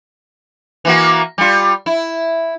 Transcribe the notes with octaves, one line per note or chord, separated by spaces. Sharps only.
E3 A#3 F#4
G3 F4
E4